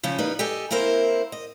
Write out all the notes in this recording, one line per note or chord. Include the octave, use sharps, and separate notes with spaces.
C#3 F3 C#4
G3 A#3 D#4 B4
G4 A4 D#5 G#5
A#3 C4 E4 A#4 C5
D#5